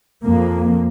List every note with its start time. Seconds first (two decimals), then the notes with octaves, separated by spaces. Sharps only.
0.22 F2 A#3